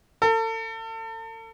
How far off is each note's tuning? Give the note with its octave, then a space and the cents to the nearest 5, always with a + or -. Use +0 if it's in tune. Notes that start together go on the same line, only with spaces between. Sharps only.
A4 +35